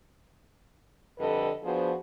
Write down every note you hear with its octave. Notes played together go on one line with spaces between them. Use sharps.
F2 D3 G3 A4 B4 D#5
F3 B3 D4 F#4 G#4 C5